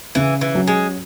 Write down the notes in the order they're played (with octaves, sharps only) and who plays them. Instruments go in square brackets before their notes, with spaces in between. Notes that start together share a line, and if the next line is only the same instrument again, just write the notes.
[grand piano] C#3 [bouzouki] E3
[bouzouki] E3
[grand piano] F#3 C#4 F#4
[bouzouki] G#3